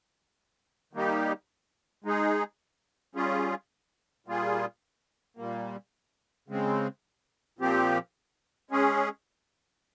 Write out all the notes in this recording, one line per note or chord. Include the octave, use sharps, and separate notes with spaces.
D#3 G3 A#3 D#4 G4
G#3 D#4 G#4
G3 C#4 F4 G#4
A#2 G3 A#3 F4 G#4
A#2 G3 A#3
C#3 G#3 C4
A#2 F3 C4 G4
G#3 C#4 G#4